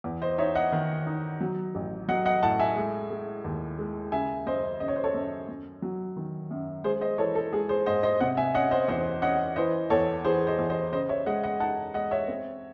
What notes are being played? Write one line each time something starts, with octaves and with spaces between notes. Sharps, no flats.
E2
C5 D#5
D#4 C#5 E5
D#5 F#5
D#3
D#4
F#3
A1
F#3 D#5 F#5
D#5 F#5
A2 F#5 A5
E5 G#5
G#3
G#3
D#2
G#3
C#3 E5 G#5
F#2 C5 D#5
C#3 D#5
C#5
C5
A4 C#5
F#2
F#2
F#3
D#3
F#2
G#3 G#4 C5
C5 D#5
E3 A4 C#5
A4
G#3 G#4
G#4 C5
G#2 C5 D#5
C5 D#5
C3 D#5 F#5
E5 G#5
C#4 D#5 F#5
C5 D#5
E2 C5 D#5
C#4 D#5 F#5
E3 C5 D#5
E2 A4 C#5
E3 G#4 C5
C5 D#5
E2
C5 D#5
C#3 C5 D#5
C#5 E5
G#3 D#5 F#5
D#5 F#5
D#4 F#5 A5
G#3 D#5 F#5
C#5 E5
C4